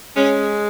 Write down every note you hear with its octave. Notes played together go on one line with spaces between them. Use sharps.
G#3 C#4